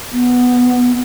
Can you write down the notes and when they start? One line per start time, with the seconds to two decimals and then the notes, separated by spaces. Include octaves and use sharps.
0.13 B3